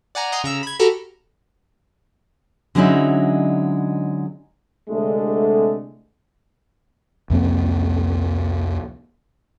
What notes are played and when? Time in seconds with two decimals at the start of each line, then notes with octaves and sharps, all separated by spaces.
0.15 D5 F#5 G#5 A#5
0.32 D#5 F#5 G#5 A#5 C6 D#6
0.44 C#3 A#5 E6
0.63 B5 G#6
0.79 F#4 G4 A4 A#5 B5 F6
2.75 D3 F#3 G#3 C#4 D#4 E4
4.90 C2 D3 G#3 A3
7.30 C2 F2 A#3 C4